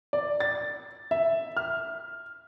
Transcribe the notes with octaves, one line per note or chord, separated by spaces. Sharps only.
D5
A6
E5
F6